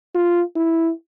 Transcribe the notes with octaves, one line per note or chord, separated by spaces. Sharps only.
F4
E4